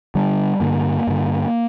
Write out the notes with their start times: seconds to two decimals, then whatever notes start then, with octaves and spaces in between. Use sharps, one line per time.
0.15 G2 D3 G3
0.60 G2 D3 A#3
1.07 G2 D3